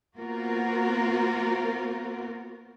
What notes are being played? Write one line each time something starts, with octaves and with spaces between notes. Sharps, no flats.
A#3 B3 F4 F#4 A#4 C5